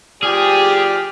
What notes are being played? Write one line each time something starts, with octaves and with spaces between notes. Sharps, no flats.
F3 G4 G#4 D5 F6